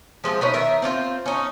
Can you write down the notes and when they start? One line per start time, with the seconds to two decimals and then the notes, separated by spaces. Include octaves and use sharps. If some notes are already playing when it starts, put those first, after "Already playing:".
0.24 F3 G#3 C4 F4
0.41 C#4 D#4 B4
0.54 D#3 A#4 E5
0.82 C4 D4 F4 C5
1.26 C#4 D#4